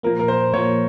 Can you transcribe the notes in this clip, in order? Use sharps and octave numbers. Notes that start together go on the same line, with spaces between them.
A#2 F3 A#3 A#4
A#4
C5
A#2 F3 A#3 C#5